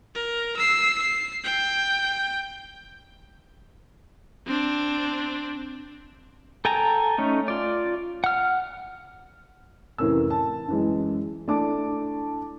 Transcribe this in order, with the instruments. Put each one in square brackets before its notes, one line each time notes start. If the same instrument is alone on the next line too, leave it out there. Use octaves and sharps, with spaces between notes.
[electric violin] A#4
E6 C7
C7
G5
C4 D4
[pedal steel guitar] A4 G5 G#5 A#5
A3 C#4 D#4
F4 D5
F#5 F6
[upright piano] F1 A2 E3 C#4 A#4 E6
A5
F#2 E3 G#3
A3 D4 E4 A4 A5 D6